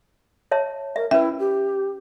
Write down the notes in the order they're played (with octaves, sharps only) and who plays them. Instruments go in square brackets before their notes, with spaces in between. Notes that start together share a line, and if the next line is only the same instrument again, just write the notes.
[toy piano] C#5 E5 A5
[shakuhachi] A#4 [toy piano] E5
[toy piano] C#4 B4 [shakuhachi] E4 [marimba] E5
[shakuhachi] G4